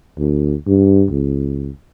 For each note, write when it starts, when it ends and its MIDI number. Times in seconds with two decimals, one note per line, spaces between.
0.18 0.54 38
0.67 1.05 43
1.10 1.69 37